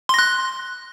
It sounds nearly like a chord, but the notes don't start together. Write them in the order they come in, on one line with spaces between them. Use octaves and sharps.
C6 A#6 F#6